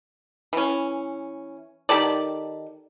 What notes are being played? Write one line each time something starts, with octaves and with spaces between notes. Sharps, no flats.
E3 C#4
D#3 G4 A4 D5